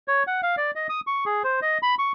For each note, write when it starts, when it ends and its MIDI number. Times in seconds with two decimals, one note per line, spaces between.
0.08 0.23 73
0.27 0.41 78
0.43 0.56 77
0.57 0.71 74
0.75 0.87 75
0.89 1.00 87
1.07 1.24 85
1.26 1.43 68
1.44 1.60 72
1.62 1.78 75
1.83 1.95 83
1.99 2.12 85